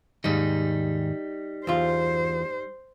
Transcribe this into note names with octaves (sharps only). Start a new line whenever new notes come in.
D#2 G#2 G3 D#4
E2 F4 C5